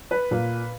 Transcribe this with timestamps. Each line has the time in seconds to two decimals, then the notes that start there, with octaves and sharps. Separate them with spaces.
0.11 B4
0.31 A#2